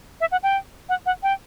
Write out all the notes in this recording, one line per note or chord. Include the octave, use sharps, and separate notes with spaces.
E5
F#5
G5
F#5
F#5
G5